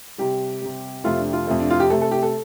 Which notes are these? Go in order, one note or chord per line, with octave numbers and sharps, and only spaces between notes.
C3 G3 G4
C3 G3
F2 C3 A3 F4
D4
F4
F2 C3 A3
D4
F4
G4
C3 A3 A4
A4
G4
A4